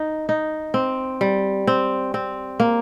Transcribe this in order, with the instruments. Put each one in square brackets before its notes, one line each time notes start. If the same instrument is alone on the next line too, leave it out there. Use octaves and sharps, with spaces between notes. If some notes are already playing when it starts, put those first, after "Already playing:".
Already playing: [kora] D#4
D#4
C4
G3
C4
C4
A#3